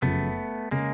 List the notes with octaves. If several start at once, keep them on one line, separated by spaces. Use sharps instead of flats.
F#1 F#2 C#3 F3 A3 B3
C#3 G#3 A#3